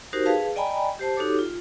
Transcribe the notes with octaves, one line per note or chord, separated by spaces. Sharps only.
D#4 F#4 G4 A#4 C5
G#4 B4 F5 A5
D5 D#5 G5 G#5 A#5 B5
G4 C5 A5
D#4 F#4 G4 A4 C#5 D6
F4